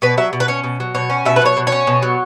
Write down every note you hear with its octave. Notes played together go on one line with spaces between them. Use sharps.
B2 B4
F#3 E5
B2
B4
C#4 C#5
B2
F#3
B2 C#5
C#4
B2 E5
B4
F#3 C#5
B2
C#5
C#4
B2
F#3